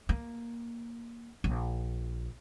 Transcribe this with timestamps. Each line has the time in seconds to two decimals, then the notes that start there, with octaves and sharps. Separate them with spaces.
0.09 A#3
1.44 A#1